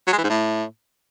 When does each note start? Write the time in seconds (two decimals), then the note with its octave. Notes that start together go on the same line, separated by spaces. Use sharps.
0.07 F#3
0.13 G#3
0.18 E3
0.24 G#2
0.29 A2